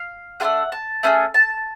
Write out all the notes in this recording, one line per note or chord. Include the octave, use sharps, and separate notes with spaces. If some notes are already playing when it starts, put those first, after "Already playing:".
Already playing: F5
A3 D4 F4 G#4 F#5
A5
A3 C#4 F4 G#4
A5